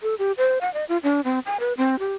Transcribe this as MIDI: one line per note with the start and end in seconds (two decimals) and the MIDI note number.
0.03 0.15 69
0.19 0.32 67
0.38 0.59 72
0.61 0.72 78
0.74 0.84 75
0.89 0.98 65
1.03 1.21 62
1.24 1.39 60
1.46 1.57 80
1.60 1.73 71
1.77 1.99 60
1.99 2.14 67